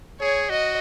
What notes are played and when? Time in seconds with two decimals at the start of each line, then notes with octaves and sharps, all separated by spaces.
0.20 G#4 C#5
0.50 F#4 D#5